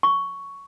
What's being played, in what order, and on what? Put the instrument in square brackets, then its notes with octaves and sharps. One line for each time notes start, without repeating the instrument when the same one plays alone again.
[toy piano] C#6